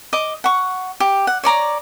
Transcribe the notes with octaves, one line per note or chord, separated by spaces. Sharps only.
D#5 D6
F#5 C#6
G4
F#5
C#5 D5 A#5 D6